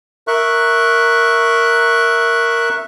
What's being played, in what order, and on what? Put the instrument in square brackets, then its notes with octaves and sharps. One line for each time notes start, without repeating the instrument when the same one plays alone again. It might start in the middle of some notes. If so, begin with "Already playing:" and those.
[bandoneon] A#4 E5 C#6 F#6